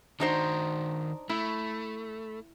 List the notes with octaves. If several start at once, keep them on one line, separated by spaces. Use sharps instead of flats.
D#3 D4 D#4 F#4 C5
A3 E4